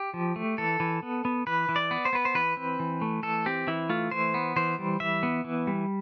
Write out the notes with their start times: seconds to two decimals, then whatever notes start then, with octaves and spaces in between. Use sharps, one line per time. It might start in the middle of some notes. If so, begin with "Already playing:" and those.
Already playing: G4
0.14 F3
0.36 A3
0.58 E3 A4
0.80 E3
1.03 B3
1.25 B3
1.47 E3 B4
1.69 E3
1.76 D5
1.91 B3
2.05 C5
2.13 B3 B4
2.25 C5
2.35 E3 B4
2.57 C4
2.80 E3
3.01 A3
3.23 E3 A4
3.46 C4 G4
3.67 E3 E4
3.89 A3 F4
4.11 E3 C5
4.34 B3
4.56 E3 C5
4.79 G3
5.00 E3 E5
5.23 B3
5.44 E3
5.67 G3